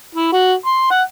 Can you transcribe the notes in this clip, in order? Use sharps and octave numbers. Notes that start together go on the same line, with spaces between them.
E4
F#4
C6
F#5